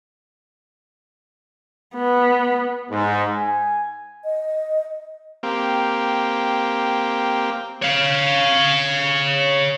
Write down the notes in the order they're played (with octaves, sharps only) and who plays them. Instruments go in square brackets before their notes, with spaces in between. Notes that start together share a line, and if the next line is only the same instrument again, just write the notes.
[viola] B3
[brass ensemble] G#2
G#5
[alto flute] D#5
[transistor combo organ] A#3 C4 G4
[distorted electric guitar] C#5 F5